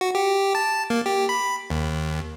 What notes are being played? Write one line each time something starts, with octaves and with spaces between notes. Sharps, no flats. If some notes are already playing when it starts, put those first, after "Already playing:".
F#4
G4
A5
A#3
G4
B5
D#2